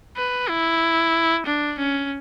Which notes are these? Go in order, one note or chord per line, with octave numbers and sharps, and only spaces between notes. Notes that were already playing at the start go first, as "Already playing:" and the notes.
B4
E4
D4
C#4